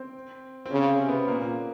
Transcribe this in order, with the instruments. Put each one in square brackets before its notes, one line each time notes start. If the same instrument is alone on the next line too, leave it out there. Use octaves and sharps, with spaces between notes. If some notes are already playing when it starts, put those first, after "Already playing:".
Already playing: [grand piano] C4
C4
[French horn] C#3 [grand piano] C#4
[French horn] C3
[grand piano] B3
[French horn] A#2 [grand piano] A#3